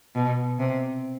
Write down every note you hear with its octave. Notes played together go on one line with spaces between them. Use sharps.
B2
C3